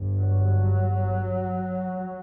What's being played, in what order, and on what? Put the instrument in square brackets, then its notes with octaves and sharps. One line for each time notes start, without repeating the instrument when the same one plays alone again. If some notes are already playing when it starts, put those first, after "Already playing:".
Already playing: [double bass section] G1 G2
F#3